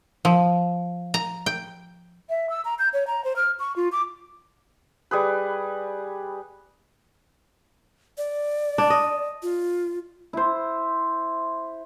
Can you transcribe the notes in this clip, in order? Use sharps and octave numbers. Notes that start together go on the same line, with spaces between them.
F3
A#5
G5
E5
E6
A#5
G6
C#5
A#5
C5
F6
C#6
F4
D6
G3 G#4 B4
D5
D4
D#5
F4
E4 C5